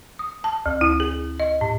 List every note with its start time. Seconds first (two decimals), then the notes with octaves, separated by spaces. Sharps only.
0.19 D#6
0.44 A5
0.66 D2
0.81 E4
1.00 G#4
1.40 D#5
1.61 A2